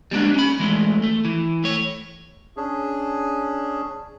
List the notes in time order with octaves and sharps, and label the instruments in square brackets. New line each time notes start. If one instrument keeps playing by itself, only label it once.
[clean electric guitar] G3 G#3 A#3 D4
C#4 B5
E3 G#3 A3
A3
E3
A3 C#5
[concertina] C#4 D4 G#4